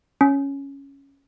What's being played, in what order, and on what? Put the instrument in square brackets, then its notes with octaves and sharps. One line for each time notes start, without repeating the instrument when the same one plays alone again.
[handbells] C#4